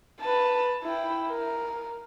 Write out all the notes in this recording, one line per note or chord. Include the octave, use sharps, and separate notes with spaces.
B4 A5
E4 G5
A#4